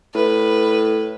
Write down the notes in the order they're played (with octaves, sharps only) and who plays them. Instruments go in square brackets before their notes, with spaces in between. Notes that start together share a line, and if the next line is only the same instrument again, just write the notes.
[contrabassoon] A2 [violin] B4